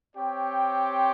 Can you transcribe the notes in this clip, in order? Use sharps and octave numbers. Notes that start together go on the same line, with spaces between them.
C4 G4 C#5 G5